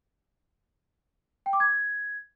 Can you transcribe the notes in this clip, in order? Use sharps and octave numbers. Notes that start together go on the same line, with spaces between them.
G5
D6
G#6